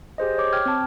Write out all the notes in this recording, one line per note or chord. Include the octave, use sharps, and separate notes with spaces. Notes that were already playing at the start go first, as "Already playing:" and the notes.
G4 G#4 C5 D#5
C#5 D6
G5 F6 G#6
C4 A5